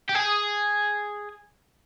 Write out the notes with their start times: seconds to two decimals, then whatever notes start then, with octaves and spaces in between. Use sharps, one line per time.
0.09 G4
0.15 G#4